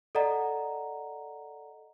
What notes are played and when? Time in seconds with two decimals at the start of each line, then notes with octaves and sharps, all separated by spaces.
0.15 A4 D5 D#5 F#5 A#5